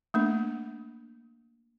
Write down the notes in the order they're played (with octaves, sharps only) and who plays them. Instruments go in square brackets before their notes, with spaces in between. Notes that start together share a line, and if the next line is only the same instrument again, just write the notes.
[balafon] A3 A#3 D4